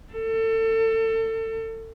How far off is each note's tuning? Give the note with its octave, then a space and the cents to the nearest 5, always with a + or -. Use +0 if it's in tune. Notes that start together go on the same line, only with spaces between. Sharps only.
A4 +30